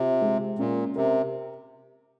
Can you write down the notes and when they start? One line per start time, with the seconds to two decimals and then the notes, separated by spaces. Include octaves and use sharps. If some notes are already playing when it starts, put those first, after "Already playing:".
Already playing: C3 F4
0.22 G#3
0.59 A#2 C#4
0.96 C3 A#4